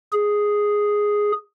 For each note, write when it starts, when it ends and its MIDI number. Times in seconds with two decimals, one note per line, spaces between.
0.12 1.32 68